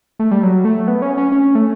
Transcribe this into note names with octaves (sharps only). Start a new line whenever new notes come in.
A3
G3
F#3
A3
B3
C#4
C#4
C#4
A3